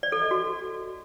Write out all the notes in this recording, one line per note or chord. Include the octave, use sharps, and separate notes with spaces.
D5
A4
D#5
F#4